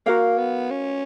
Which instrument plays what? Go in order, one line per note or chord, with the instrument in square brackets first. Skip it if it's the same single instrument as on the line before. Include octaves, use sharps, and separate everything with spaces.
[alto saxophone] A#3 [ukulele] F#4 A#4 F5
[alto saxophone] B3
C#4